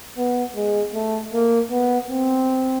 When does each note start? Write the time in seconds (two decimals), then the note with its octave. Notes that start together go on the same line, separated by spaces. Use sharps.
0.17 B3
0.56 G#3
0.94 A3
1.33 A#3
1.71 B3
2.09 C4